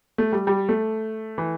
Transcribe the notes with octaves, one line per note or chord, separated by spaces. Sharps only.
A3
G3
G3
A3
E3